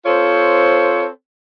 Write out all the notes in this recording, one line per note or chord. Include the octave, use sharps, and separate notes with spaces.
C4 F4 A4 C5 C#5